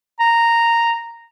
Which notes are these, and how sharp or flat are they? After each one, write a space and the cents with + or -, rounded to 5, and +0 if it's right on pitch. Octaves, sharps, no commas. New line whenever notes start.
A#5 -5